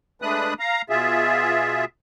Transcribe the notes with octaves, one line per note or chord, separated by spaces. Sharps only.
G#3 A3 D4 B4 D#6 F#6
F5 A#5
B2 F4 G#4 E5